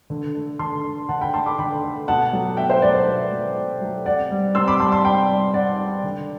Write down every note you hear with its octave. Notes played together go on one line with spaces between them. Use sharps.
D3
A3
D3 A5 C6
A3
D3 F#5 A5
G5 B5
A3 A5 C6
B5 D6
D3 G5 B5
A3
B2 F#5 A5
F#3 A3
B2 E5 G5
C5 E5
F#3 A3 B4 D5
C5 E5
B2
F#3 A3
B2
F#3 A3
C3 D5 F#5
G3
C3 C6 E6
B5 D6
G3 A5 C6
A5 C6
C3 G5 B5
G3
C3 D5 F#5
G3
D3